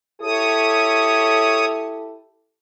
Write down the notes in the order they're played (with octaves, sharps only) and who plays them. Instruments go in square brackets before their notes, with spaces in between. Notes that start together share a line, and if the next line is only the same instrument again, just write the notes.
[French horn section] E4 G4 A4 [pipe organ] C#5 D#6